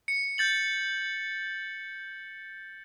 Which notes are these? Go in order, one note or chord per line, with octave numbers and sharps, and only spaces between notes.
C#7
G6 A6 F#7